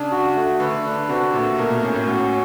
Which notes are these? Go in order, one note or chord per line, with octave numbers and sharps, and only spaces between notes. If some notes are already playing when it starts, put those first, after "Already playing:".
Already playing: C#3 D4
F#4
A3
D3 B4
D4
C3 F#4
A#2 A3
B2 A#4
A#2
A2 C#4
A2
A2 F#4